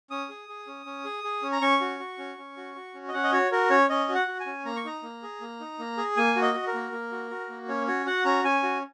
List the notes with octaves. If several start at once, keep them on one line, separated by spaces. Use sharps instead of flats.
C#4 D#6
G#4
G#4
C#4
C#4
G#4
G#4
C#4
A#5
C#4 C#6
F#4
F#4
C#4
C#4
F#4
F#4
C#4
D#5
C#4 F#5
D#5
F#4 C#5
F#4 A#4
C#4 C#5
C#4 D#5
F#4
F#5
F#4
G#5
C#4
A#3 A#5
C#6
D#4 A#5
A#3
G#4
A#3
D#4
A#3
G#4
A#3 G#5
F#4
D#5
F#4
A#4
A#3
A#3
F#4
F#4
A#3
C#4 C#5
F#4 C#5
F#4 F#5
C#4 A#5
C#4 G#5
F#4